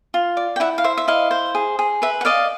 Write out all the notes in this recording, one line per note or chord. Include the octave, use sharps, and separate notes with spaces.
F4
D5
G5
E4 E5 F#5
F5
C5 E5
E5
E4 D#5 F5
C5
G#4
G#4
B4 E5
F#5
D5 D#5 F5